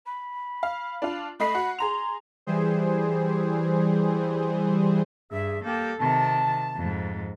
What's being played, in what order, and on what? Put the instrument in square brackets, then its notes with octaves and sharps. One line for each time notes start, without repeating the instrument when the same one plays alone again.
[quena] B5
[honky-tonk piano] F5
D4 F4
[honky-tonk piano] A3 D#5 C7 [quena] B5
[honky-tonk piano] F#4 F#5
[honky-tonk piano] G#4 A#5 F7 [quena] C6
[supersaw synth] E3 G3 G#4 C5
[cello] G2 [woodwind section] G#4 E5
[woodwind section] G3 A#3 G4 [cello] A4
[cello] C3 D#3 [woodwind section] A5
[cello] F2 G#2